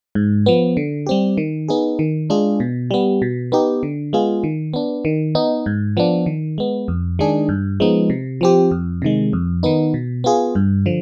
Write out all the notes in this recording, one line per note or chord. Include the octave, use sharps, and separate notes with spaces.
G#2
F3 B3
D3
G3 C4 G4
D#3
B3 D#4 G#4
D#3
G#3 D4 F4 G#4
B2
G3 B3
B2
B3 D#4 G4
D3
G#3 B3 F4 G#4
D#3
B3 D4
D#3
B3 D#4
G#2
F3 B3 D4
D#3
G#3 B3
F2
D#3 G#3 D4 G#4
G2
F3 G#3 B3 D#4
C3
F3 C4 G4
F2
C3 D#3 G#3
F2
D#3 B3 D#4
B2
B3 F4 G#4
G2
D3 F3